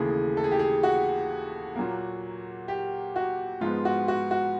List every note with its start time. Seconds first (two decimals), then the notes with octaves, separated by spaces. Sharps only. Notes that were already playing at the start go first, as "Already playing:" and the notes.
Already playing: D#2 C#3 E3 A3 G#4
0.37 A4
0.44 G#4
0.51 G4
0.59 G#4
0.83 F#4
1.76 A#2 F#3 A#3
2.68 G4
3.16 F#4
3.61 G#2 F3 G#3 B3 F4
3.85 F#4
4.08 F#4
4.31 F#4